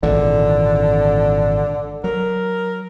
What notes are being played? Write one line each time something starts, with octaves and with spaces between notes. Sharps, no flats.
G#1 A#2 D3 E3
F#3 A#4